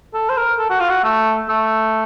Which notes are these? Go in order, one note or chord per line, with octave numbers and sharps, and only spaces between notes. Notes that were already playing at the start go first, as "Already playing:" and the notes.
A4
C5
A#4
A4
F#4
F4
F#4
A3
A3